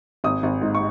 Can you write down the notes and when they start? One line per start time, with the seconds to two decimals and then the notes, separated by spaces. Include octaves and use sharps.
0.24 G#1 D#6
0.43 G#1
0.62 G#2
0.75 C#6